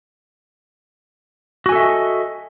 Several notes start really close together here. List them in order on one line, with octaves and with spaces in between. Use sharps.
F#4 G#5 A4 E5 D#5